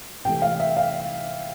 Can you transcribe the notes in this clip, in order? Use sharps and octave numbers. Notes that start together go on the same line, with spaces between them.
C3 E3 A3 G5
F5
E5
F5